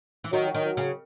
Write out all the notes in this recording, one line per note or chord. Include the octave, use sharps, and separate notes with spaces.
E3
D#3 F#3
F#3
D#3
F#3
C#3